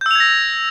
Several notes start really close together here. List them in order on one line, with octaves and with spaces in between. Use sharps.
G6 E6 F7 G#6 A#6